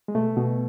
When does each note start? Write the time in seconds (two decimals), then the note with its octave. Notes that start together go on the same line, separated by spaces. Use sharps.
0.08 G#3
0.15 B2 A3
0.36 B2